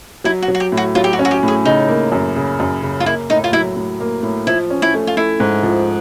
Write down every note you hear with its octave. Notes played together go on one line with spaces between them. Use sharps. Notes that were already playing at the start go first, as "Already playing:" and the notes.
F#3 E4
F#4
F#3
F#4
G4
A2
F#4
F#3 F4
G4
F#4
C#4
F#4
G4
A2
G#4
C#3 D#4
A#3
F#2
C#3
F#2
C#3
F4
A#3 E4
A2 D#4
F4
F#3 E4
A2
A#3
A2
F3 E4
C#4
E4
A3
F4
A3 E4
G#2
F3